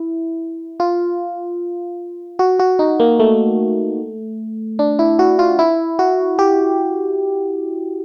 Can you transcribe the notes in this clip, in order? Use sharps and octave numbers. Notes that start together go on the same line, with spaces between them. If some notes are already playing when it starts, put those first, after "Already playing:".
Already playing: E4
F4
F#4
F#4
D#4
A#3
A3
D4
E4
F#4
F4
E4
F#4
G4